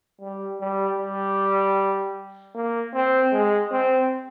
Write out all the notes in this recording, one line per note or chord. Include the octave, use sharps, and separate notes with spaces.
G3
G3
G3
A#3
C4
G#3
C4